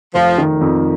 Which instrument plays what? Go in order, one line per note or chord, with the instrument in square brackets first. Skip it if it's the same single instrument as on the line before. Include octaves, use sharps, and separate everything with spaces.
[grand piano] F1 [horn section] F3
[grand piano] D#3
F2